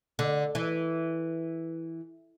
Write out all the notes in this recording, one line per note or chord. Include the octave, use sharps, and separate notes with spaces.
D3
E3